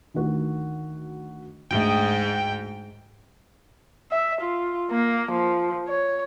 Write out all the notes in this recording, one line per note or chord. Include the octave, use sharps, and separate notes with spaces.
D2 D#3 F#4
D2 G#2 E5 G5
E5
F4
A#3
F3
C#5